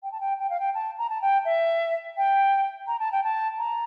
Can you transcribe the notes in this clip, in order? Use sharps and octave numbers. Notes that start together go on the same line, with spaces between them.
G5
A5
G5
G5
F5
G5
A5
A#5
A5
G5
E5
G5
A#5
A5
G5
A5
A#5